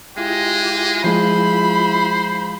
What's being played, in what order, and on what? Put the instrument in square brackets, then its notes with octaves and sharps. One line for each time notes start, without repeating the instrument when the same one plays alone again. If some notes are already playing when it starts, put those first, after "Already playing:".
[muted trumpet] G#3 [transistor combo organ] E4 F4 [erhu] G4
[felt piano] F3 G#3 [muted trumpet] C5 [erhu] B5